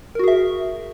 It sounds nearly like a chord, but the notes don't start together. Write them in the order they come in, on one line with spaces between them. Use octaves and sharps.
A#4 F#4 G#4 E5